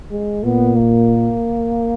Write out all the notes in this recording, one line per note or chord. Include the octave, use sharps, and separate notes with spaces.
G#3
A#2 B3
A#3